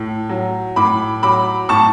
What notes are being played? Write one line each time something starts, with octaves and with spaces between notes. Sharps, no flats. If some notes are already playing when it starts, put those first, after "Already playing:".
Already playing: A2
F#3
A2 B5 D6
F#3 B5 D6
A2 A5 C#6